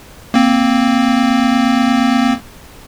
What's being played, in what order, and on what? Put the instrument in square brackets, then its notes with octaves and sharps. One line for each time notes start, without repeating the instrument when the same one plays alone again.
[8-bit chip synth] A#3 C4